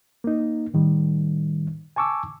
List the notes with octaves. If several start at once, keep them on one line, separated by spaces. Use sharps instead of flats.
A#3 D#4
A2 D#3 G3
G#5 A5 C#6 D6 E6